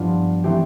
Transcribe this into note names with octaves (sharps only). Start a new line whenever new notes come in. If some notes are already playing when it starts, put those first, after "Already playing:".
Already playing: G2 F3 B3 D4 F4
E3 A3 C4 G4